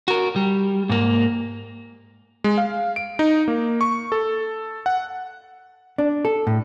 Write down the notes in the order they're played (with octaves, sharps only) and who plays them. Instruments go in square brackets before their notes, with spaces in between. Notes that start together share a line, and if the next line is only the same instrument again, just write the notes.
[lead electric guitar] F#4 A#4
G3
G#2 A#3
[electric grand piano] G#3
F5
D7
D#4
A#3
C#6
A4
F#5
[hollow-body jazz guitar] D4
A4
A2